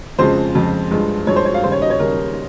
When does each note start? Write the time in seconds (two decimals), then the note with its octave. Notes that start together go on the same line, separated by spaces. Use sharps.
0.19 F2 C#3 F3 G#3 C5
0.55 F2 C#3 F3 G#3
0.91 G2 F3 G#3
1.27 G2 F3 G#3 C#5
1.36 C5
1.45 C#5
1.54 F5
1.64 D#2 C#3 G3 C5
1.72 C#5
1.82 D#5
1.90 C#5
2.00 D#2 C#3 G3 A#4